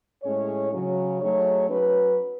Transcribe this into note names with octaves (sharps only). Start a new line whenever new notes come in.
A2 G#3 C#4 G#4 C#5
C#3 F#3 C#4
F#3 A3 D#4 G#4 C#5
F#3 C#4 F#4 B4